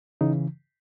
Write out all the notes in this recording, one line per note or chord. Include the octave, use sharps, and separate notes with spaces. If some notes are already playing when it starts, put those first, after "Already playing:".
C#3 E3 D#4